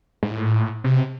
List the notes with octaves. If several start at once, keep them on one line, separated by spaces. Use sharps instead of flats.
G#2
A2
C3